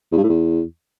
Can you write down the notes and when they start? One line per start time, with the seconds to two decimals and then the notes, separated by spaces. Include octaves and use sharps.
0.12 E2
0.17 G2
0.23 A2
0.29 E2